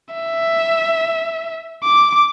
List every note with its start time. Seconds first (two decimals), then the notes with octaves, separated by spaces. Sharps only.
0.15 E5
1.84 D6